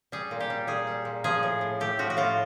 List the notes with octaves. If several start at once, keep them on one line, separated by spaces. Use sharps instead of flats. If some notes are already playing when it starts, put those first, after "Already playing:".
G3 G#4
A#2
G4
G3
A#2 G#4
G3
A#2
F3 G#4
A2
A2
A3 G4
F3 F#4
F#4
A2 F4